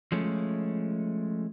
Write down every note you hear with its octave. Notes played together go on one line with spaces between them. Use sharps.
F3 G#3 A3 C#4